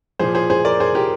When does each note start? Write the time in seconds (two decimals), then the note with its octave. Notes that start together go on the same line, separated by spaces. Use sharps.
0.19 A#2 F3 G#4 C5
0.35 G#4 C5
0.50 G#4 C5
0.65 A#4 D5
0.80 G#4 C5
0.95 G4 A#4